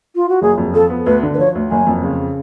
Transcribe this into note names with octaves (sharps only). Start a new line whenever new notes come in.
F4
F#4
F#1 G#4
F2
F3 A4
B3
D2 B4
D3
B4
F3 C#5
D2
F#1 G#5
F2
C#3